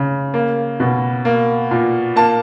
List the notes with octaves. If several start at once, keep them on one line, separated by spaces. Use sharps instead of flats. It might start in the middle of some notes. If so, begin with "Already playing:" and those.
Already playing: C#3
A#3
B2
A#3
A#2
A#3 A5